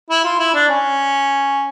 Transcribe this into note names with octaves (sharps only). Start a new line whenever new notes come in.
E4
F4
E4
D4
C#4